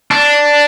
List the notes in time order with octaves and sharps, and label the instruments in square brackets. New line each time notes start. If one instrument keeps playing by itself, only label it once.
[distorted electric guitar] D4